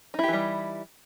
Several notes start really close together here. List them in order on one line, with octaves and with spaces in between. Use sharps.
D#4 E4 G4 E3 G3